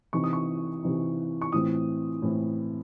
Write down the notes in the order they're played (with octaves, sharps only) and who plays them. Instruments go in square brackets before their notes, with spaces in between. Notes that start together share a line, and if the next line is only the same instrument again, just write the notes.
[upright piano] C3 E3 C4 D#4 C#6
D#6
C#6
C3 E3 C4 D#4
C#6
A2 E3 C4 D#6
A2 E3 C4